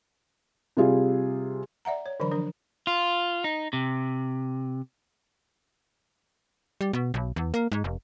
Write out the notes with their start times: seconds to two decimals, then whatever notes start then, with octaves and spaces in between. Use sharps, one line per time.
0.77 C3 G3 F4 G#4
1.85 D5 E5 F#5 A#5
2.06 C#5
2.20 D3 E3 F#3 D4 B5
2.31 F3 D4 A#4
2.87 F4
3.44 D#4
3.73 C3
6.81 G3
6.93 B2
7.14 B1
7.36 E2
7.54 A#3
7.72 G#2
7.84 F1